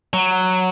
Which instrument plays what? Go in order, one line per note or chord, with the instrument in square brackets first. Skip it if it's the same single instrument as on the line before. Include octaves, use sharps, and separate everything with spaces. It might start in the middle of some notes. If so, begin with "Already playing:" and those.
[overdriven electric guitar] F#3